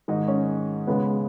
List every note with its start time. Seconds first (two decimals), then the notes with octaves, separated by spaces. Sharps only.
0.08 G#2 D#3 G#3 D#4
0.28 C#4
0.87 C#2 C#3 G#3 B3